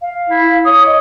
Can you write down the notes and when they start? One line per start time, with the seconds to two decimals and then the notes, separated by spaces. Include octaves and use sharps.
0.02 F5
0.29 E4
0.65 C#5 D#6
0.86 D#5